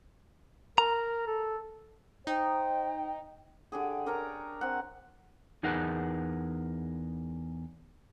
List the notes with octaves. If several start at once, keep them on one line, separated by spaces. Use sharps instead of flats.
A#4 A#5
A4
D#4 C5 G5
D3 G4 G#4
D4 A#4 C#5 A#5
C4 F#5
E2 D#4 G#4 A#4 B4 F#5